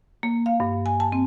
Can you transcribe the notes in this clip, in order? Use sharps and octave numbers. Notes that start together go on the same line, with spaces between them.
A#3
F5
G2
G#5
A5
C4